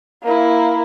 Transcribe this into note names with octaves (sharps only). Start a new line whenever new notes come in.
A#3 E4